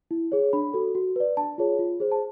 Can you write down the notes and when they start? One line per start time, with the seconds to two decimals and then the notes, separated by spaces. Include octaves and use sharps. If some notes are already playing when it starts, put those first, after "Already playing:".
0.11 E4
0.32 G#4 C#5
0.53 D4 B5
0.74 F#4 A4
0.95 F#4
1.16 B4 D5
1.37 D4 A5
1.58 F4 G#4 C#5
1.79 F4
2.00 G#4 C5
2.12 A5